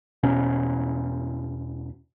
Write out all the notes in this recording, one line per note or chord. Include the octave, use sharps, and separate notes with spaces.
E2 B2 C#4